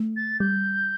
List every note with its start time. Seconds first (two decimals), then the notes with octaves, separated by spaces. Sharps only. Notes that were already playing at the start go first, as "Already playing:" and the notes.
Already playing: A3
0.16 A6
0.40 G3 G6